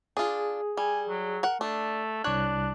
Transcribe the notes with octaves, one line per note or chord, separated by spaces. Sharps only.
D4 F4 G#4
G3 G#5
F#3
A#4 F#5
A3 D4
C2 D4 C#5 F#6